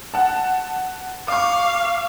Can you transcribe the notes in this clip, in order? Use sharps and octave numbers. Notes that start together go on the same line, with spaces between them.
F#5 A5
F5 C#6 D6